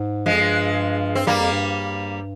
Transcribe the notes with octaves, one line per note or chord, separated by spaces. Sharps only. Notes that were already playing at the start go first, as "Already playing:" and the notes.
Already playing: G#2
G2 F3 G#3
F2
G2
C4
G2 G3 A#3
F2
G2